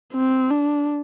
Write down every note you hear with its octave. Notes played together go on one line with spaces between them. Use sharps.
C4
D4